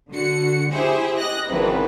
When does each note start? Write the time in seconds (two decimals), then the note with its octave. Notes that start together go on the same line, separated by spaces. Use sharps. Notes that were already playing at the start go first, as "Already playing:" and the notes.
0.11 D3 F#4 C#7
0.72 E4 G4 G#4 C5 E5
1.18 D#5 F#6 A#6
1.47 G#1 C#3 E3 B4